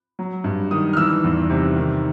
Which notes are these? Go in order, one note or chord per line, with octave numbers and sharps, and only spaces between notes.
F#3
G2
D#3 D#6
F6
E3 E6
E2
C3
D#3